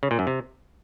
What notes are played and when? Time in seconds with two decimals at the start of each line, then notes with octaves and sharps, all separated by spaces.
0.03 C#3
0.11 A#2
0.19 F#2
0.27 C3